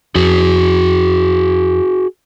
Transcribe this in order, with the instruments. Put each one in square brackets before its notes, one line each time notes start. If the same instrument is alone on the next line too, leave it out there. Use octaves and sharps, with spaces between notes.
[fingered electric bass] F2 [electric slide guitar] F#4 G#4